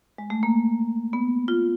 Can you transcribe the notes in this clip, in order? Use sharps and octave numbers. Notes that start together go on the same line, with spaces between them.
G#3
A3
A#3
B3
F4